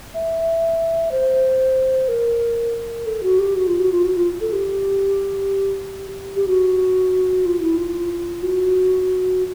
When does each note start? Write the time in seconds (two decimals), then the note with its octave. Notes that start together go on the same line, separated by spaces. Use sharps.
0.14 E5
1.11 C5
2.08 A#4
3.06 A4
3.23 F#4
3.39 G4
3.55 F#4
3.67 F4
3.80 F#4
3.92 F4
4.04 F#4
4.16 F4
4.41 A4
4.53 G4
6.36 G4
6.48 F#4
7.46 F4
7.62 E4
7.78 F4
8.43 F#4